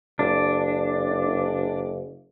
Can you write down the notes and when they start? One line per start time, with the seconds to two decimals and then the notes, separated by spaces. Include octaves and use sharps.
0.19 F#1 D4